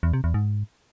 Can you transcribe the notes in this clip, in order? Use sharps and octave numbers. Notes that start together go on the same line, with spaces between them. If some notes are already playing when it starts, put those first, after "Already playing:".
E2
C3
E2
G#2